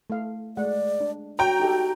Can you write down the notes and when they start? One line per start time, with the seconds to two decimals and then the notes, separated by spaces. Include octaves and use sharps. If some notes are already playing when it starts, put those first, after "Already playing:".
0.10 A3 F5
0.57 G#3 A3 D5 F#5
1.00 D4
1.39 F#4 C#5 G5 A#5
1.60 D#4 G4 A4